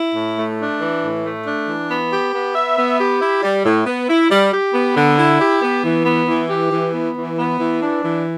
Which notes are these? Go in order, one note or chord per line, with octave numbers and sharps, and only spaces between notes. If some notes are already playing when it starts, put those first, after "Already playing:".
Already playing: E4
A2
A3
D4
E3
A2
A3
D4
E3
B3
G4
B3
E5
B3
G4
E4
G3
A2
B3
E4
G3
G4
B3
D3
E4
G4
B3
E3
B3
E3
G4
E3
B3
E3
B3
E3
D4
E3